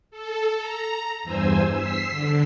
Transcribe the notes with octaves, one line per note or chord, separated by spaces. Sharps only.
A4
A#5
E2 G2 C5 G#5 E6
E6 B6 C7
D3